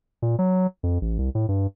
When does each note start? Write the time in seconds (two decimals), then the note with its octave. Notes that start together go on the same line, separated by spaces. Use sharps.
0.22 A#2
0.39 F#3
0.83 F2
1.01 A1
1.18 C2
1.35 A2
1.49 G2